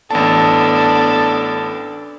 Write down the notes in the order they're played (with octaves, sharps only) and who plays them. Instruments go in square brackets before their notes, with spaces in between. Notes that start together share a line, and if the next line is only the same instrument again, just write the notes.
[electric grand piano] A1 A5 [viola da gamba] B3 D4 A4